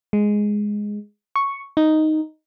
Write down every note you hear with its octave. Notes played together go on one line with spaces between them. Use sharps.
G#3
C#6
D#4